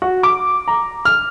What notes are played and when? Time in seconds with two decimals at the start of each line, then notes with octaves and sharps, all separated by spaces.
0.02 F#4
0.23 D6
0.68 A#5
1.05 F6